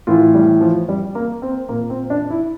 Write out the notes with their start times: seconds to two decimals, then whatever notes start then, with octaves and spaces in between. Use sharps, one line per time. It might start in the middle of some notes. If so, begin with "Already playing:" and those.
0.07 A2 E3 F4
0.34 G3
0.61 F3
0.89 G3
1.15 A#3
1.42 C4
1.69 A#2 A#3
1.90 C4
2.10 D4
2.30 E4